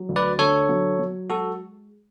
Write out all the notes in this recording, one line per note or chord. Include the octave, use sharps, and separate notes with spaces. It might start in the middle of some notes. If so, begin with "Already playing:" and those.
Already playing: F#3
D2
B4 D5
D3 A4 C#5
F#3
F#3
G#3 F#4 A4